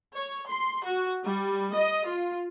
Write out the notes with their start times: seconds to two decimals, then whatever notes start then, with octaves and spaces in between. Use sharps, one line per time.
0.16 C#5
0.48 C6
0.86 F#4
1.24 G3
1.74 D#5
2.06 F4